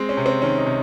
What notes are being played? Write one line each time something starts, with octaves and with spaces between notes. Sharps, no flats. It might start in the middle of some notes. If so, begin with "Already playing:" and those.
Already playing: G#3 C4
C#4
C3
C4
D#3 C#4
D#4
C3